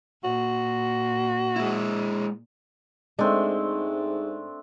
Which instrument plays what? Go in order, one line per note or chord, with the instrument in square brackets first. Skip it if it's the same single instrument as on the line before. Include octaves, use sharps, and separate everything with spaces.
[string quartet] A#2 [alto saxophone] F#4
[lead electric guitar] G#3 E4
[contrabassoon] G#2 [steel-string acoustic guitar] G#3 [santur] A3 C4 D4